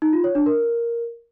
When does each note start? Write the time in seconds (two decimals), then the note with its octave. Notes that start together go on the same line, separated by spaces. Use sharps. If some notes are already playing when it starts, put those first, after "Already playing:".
0.02 D#4
0.13 F4
0.24 C#5
0.35 D4
0.46 A#4